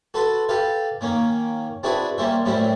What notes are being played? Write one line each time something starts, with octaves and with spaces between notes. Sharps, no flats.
F#4 A4 B4 A5 C6
G4 A4 B4 F5
D#3 A#3 C#4
C4 D4 E4 F#4 G#4 B4
G3 A#3 C#4 C5 E5
F#2 A2 G3 C4 C#4 E4